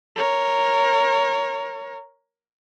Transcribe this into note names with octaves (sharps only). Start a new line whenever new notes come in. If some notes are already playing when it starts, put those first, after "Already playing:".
A#4 C#5